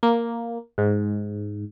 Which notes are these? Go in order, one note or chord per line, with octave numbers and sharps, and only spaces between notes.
A#3
G#2